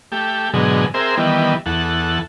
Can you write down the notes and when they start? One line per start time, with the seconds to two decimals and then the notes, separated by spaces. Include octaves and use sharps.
0.12 A3 G4
0.54 G#2 B2 D3 F#3 G#3
0.94 C4 G#4 A#4 C5 E5
1.17 D#3 E3 G3 B3
1.66 E2 A4 F#5